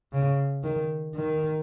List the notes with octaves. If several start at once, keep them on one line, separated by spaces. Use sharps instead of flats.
C#3
D#3
D#3